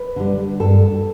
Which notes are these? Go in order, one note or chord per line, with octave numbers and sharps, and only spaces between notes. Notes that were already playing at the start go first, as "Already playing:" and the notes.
Already playing: B4
D3 G3
G2 A4